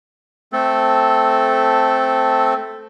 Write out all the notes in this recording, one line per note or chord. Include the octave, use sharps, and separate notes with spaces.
A3 C4 A4